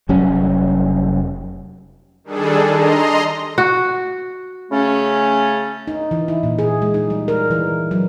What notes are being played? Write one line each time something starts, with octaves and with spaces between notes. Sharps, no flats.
F1 F#3 G3 C#4
D#3 G3 D4 G#4 A4
D#5 A#5 C6
F#4
C#3 A3 C#4
D#4
E3
E4
A#2
G#4
G#3
D#4
G3
A#4
E3
F#3